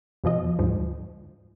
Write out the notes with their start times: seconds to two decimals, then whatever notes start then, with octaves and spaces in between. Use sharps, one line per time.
0.24 F2 B2 F3 D#5
0.59 D2 G#2 F3